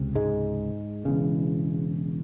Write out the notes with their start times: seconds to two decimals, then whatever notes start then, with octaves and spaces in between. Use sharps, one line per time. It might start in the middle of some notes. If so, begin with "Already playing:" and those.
Already playing: C#2 C3
0.15 G#2 G#3
1.05 E1 E2 C#3